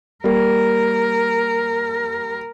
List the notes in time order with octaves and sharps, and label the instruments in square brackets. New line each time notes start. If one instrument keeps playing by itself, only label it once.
[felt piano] G3 A#3 [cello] A#4